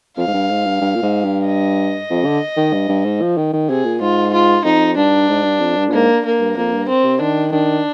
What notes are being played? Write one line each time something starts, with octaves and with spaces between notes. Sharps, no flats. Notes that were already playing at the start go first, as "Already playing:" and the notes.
F2 F5
G#2
G2
G#2
G2
G2
A#2
G#2
G2
D#5
F2
D3
D#3
G2
G2
G#2
F3
D#3
D#3
C3 G#4
A#2
G#2 F4
F4
F2 D#4
G2 D4
G#2
G2
F2
G2
A#2
G#2 A#3
A#3
G2
F2 A#3
G2
C4
C3
D#3 D4
D#3 D4